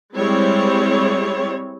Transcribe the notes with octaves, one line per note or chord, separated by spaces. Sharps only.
G3 G#3 C4 E4 C#5